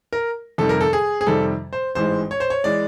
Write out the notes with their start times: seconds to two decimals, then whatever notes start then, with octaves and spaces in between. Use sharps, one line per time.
0.13 A#4
0.58 F2 C3 D#3 G3 A4
0.69 A#4
0.81 A4
0.93 G#4
1.21 G#4
1.27 F2 C3 D#3 G3 A4
1.73 C5
1.95 A1 G#2 E3 G#3 C5
2.31 C#5
2.40 C5
2.50 C#5
2.64 E3 G#3 D5